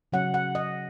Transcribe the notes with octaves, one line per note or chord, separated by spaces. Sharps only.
C#3 F#3 C#4 F#5
F#5
D#5